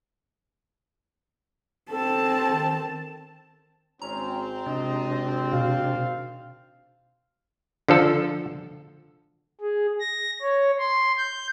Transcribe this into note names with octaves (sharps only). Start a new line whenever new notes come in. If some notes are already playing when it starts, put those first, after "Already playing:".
C4 A4 A5
D#3
G#1 C4 C#4 A#5
C3 D4 D#5
B2 F5
D3 F3 A4
G#4
A#6
C#5
C6
G6